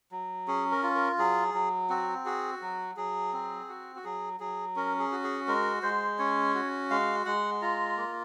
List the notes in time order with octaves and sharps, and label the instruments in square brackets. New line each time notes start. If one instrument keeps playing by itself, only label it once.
[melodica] F#3
C#4 G#4
A#4
F4
A#4
F#3 G#4
F#3
C4 F#4
F#4 G#4
F#3
F#3 G#4
C4
F#4
F#4
F#3 G#4
F#3 G#4
C#4 A#4
G#4
F#4
G#4
G#3 A#4
G#3 C5
C#4 C#5
F#4
G#3 F5
G#3 F#5
F4 A#5
A#3